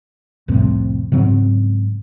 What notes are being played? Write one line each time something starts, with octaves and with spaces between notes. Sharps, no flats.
C2 F2 A2 C3
G#2 C#3 F#3 C4